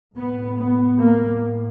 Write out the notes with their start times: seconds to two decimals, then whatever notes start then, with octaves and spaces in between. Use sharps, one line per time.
0.16 A2 B3
0.59 B3
1.00 A#3